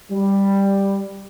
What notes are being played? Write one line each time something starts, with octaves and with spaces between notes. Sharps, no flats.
G3